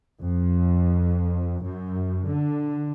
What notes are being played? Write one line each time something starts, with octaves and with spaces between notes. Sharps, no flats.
F2
F#2
D3